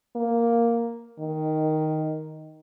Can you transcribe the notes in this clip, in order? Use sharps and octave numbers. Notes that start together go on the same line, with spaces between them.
A#3
D#3